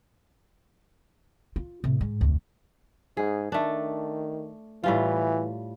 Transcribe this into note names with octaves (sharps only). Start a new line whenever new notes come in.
F4
A2 C3
G#2
F1 D2
G#2 G#4
D#3 A3 D4
A2 E3 G3 F4